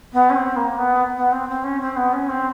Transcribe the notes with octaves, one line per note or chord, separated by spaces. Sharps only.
B3
C#4
C4
A#3
B3
B3
C4
C4
C#4
C4
B3
C#4
C4